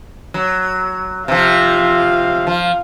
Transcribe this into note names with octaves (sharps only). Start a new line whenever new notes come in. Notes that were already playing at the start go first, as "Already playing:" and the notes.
F#3
C3 F3 F4 F5
F3